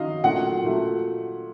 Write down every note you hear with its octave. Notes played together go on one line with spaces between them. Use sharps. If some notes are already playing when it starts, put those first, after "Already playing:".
Already playing: D#3 F#3 D#5 F5
A#2 F#3 A3 F#5
A#2 F#3 A3